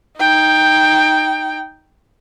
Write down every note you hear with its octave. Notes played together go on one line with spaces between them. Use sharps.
D#4 G5